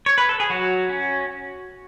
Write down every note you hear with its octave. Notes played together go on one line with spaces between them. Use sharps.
C#5
B4
A4
G#4
F#3 F#4
C#4